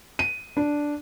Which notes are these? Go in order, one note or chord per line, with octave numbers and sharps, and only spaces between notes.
D#7
D4